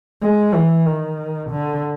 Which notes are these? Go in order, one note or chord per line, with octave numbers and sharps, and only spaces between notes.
G#3
E3
D#3
D3